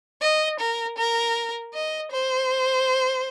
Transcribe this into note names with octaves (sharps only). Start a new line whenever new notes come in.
D#5
A#4
A#4
D#5
C5